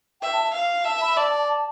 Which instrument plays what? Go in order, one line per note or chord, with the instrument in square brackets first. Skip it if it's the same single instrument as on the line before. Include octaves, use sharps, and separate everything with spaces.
[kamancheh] E5 [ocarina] G5
[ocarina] A5
[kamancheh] F5
[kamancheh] E5 [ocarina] A5
[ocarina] B5
[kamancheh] D5 [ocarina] A5
[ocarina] A5
A5